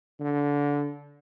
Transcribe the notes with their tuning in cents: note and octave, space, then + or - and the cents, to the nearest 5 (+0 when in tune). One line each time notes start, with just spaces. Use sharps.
D3 -20